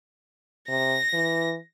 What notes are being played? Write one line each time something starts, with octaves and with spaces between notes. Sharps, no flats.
C3 A#6
E3